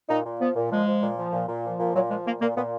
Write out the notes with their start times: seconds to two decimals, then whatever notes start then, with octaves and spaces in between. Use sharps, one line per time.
0.09 A#2 D#4
0.25 A#2
0.40 F3 B3
0.55 A#2
0.71 F3 G#3
0.87 F3
1.02 A#2
1.18 F3
1.33 A#2
1.48 A#2
1.64 F3
1.79 A#2
1.94 A#2 F#3
2.10 F3 G#3
2.25 A#2 A#3
2.41 A#2 A#3
2.56 A#2 B3